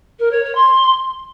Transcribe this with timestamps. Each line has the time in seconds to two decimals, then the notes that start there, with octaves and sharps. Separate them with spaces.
0.19 A#4
0.31 C#5
0.43 C#5
0.55 C6